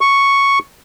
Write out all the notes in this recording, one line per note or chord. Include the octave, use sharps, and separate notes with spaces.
C#6